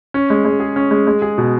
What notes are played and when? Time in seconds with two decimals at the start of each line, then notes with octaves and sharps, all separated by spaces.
0.14 C#4
0.30 G#3
0.45 G#3
0.60 G#4
0.76 C#4
0.91 G#3
1.07 G#3
1.22 G#4
1.38 B2